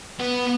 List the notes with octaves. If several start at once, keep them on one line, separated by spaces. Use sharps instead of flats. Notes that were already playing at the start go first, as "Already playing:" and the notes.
B3